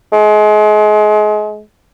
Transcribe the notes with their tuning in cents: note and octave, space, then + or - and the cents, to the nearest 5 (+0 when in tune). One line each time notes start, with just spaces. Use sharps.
G#3 +30